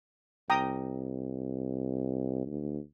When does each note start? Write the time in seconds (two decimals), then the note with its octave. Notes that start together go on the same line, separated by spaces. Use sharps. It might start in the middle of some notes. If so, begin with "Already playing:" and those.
0.50 C2 G5 A#5 D#6
2.46 D2